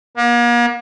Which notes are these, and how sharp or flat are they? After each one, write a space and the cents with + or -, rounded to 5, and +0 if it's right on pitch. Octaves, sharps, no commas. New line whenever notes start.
A#3 +40